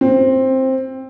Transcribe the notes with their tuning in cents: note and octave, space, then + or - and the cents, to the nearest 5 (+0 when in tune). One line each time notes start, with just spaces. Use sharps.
C4 +10